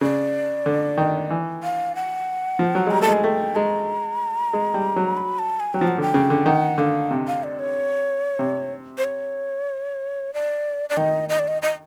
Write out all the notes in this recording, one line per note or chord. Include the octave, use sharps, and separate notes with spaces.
C#3 D5
D3
D#3
E3
F5
F#5
F3
F#3
G#3
G3 A#5
A3 A5
G#3 G#5
A3 G5
G#3 A#5
G#3
G3
F#3
B5
A5
G#5
F#3 G5
F3
F#5
D3 G5
C#3
D3
D#3 F#5
D3 F5
C3
F5
D5
C#5
C3
C5
C#5
D5
D5
D#3 D#5
D#5
D5
D#5
D#5